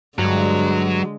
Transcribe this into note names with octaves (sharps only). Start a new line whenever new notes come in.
G2 D3 F#3 G#3